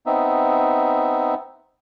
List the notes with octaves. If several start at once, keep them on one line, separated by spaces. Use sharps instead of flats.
B3 C4 D#4 E5